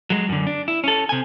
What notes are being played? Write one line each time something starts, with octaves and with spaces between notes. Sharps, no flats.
F#3 G#3
F#2 D3
D4
E4
C#4 A4
C3 G#5